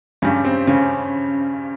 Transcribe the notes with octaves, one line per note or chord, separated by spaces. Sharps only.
G2 C#3 G3 C#4
C4
C#3 C#4